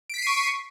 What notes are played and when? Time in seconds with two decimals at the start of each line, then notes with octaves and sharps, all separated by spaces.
0.10 D7
0.14 B6
0.18 C7
0.22 D#7
0.27 C#6